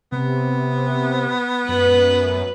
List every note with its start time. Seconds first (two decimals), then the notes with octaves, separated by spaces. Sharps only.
0.12 C3 B3
1.69 F#2 B4